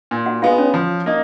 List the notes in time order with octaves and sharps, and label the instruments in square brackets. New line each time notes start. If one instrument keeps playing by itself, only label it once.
[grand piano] A#2
[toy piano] F#4 F#5
[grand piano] G#3 B3 [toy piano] F4 F5
[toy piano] C#4 C#5
[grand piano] F3
A#3 D#4